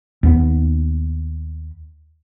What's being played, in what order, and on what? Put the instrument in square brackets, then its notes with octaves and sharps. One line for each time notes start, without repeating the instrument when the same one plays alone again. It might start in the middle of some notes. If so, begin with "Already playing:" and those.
[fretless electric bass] D#2 B3